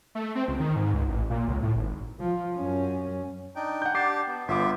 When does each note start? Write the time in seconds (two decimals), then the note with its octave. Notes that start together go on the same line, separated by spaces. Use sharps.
0.15 A3
0.35 C4
0.48 C#2
0.60 D#3
0.76 G#2
0.94 C#2
1.08 A1
1.30 A#2
1.48 C#2
1.63 A2
1.76 G#1
2.20 F3
2.55 F#2 C#4
3.56 D4 D#4 G5
3.82 F#5 G6
3.95 D4 G4 A5 D6 C7
4.27 B3
4.48 G1 B3 F4 E5 D6